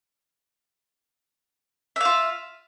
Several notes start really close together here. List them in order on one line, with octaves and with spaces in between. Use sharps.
E5 F5 F4